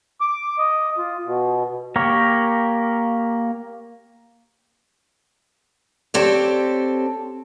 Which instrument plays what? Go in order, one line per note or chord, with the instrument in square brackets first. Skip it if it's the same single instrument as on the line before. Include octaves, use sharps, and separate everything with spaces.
[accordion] D6
D#5
F4
B2
[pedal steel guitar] A#3 G4 A#4 C#5
[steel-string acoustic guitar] C4 G4 A4 C#5 D5